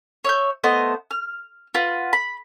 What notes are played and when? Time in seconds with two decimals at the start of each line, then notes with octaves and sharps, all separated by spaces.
0.24 C#5 E5 G6
0.64 A3 B3 C5 D#5
1.11 F6
1.74 F4 B4 F#5
2.13 B5